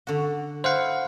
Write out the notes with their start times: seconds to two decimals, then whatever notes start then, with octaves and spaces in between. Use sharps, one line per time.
0.07 D3 F#4
0.64 E4 C5 F5 F#5